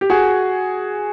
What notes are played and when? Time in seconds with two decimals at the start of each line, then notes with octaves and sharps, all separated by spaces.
0.01 G4
0.10 F#4 G#4